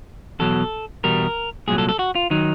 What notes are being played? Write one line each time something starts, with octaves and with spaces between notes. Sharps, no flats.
E2 B2 F#3 A4
E2 B2 G3 A#4
C2 A#2 F#3 G#4
A4
A4
F#4
F4
D#3 F#3 D#4